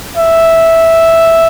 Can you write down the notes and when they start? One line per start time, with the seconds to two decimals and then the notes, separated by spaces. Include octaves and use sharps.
0.17 E5